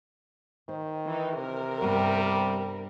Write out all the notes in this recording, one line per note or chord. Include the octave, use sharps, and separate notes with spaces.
D#3 C5
E3 D#4
C3 A#4
G2 G3 B3